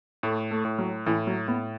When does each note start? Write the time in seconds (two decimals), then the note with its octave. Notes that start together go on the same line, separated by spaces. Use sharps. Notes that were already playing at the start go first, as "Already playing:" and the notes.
0.23 A2 A3
0.51 A3
0.65 A2
0.79 F#3
1.06 A2 E3
1.27 F#3
1.48 A2 B3